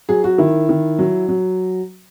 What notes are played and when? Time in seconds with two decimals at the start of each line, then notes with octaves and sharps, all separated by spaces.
0.09 F#3 G#4
0.24 F#4
0.38 D#3 E4
0.69 D#3
0.99 F#3
1.28 F#3